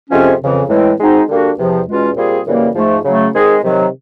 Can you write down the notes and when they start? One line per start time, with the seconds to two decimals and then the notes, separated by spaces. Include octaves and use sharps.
0.10 F2 C3 F3 G#3 C#4
0.40 F2 C#3 E3
0.69 A2 E3 G#3 C4
0.99 G#3 C4 D#4 F#4
1.28 D3 G3 A#3 D4 F#4
1.57 E2 C3 F3
1.87 E2 B2 G#3 C#4 F4
2.16 A#2 G3 C4 F4 G#4
2.46 F#2 C#3 E3 G3 A#3
2.75 G#2 F3 A3
3.04 C#3 F#3 A3
3.34 D#3 G#3 C4 D#4 G#4
3.63 C3 D#3 F#3